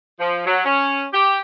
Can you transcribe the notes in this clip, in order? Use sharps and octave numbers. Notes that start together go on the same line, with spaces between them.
F3
F#3
C#4
G4